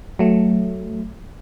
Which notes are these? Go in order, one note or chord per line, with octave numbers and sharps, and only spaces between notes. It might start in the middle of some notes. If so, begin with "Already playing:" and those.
F#3 A3